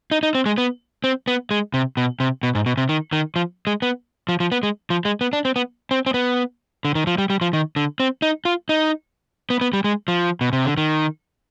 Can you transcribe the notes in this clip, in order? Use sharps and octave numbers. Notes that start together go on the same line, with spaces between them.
D#4
D#4
C4
G#3
B3
C4
B3
G#3
C3
B2
C3
B2
G#2
B2
C3
D#3
D#3
F3
G#3
B3
F3
F3
B3
G#3
F3
G#3
B3
D4
C4
B3
C4
C4
B3
D3
D#3
F3
G3
G3
F3
D#3
D3
C4
D#4
F4
D#4
B3
B3
G3
G#3
F3
B2
C3
D3
D#3